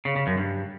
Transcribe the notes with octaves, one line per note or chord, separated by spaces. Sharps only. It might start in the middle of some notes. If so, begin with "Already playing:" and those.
C#3
C#3
F#2
G2